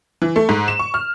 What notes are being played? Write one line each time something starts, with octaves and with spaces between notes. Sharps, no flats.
E3
A3
G#2
E7
C#6
F6